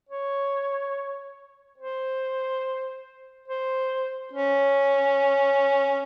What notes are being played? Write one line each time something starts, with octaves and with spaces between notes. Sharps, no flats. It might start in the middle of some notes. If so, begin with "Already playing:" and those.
C#5
C5
C5
C#4